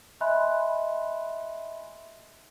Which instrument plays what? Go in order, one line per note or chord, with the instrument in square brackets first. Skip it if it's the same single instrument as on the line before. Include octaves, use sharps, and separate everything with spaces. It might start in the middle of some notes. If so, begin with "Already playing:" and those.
[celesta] D#5 E5 G#5 B5 C6 F#6